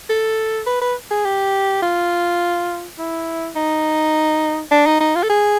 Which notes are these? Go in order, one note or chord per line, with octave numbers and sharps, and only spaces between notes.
A4
B4
B4
G#4
G4
F4
E4
D#4
D4
D#4
D#4
F4
A4
G#4